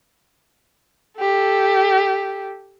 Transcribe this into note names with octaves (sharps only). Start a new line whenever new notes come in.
G4 A4